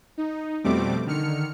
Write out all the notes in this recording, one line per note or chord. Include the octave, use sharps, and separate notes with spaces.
D#4
F2 B2 G3 A3 C4 D6
D3 D#3 F6 C#7